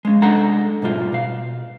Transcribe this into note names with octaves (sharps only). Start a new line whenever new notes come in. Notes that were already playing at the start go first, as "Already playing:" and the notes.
G#3 C#4
C2 G#3 D4 A4 F#5 A#5
G#2 B2 G3 F4
B2 F5